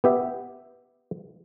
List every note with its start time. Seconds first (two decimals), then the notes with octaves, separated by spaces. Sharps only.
0.04 B3 G4 E5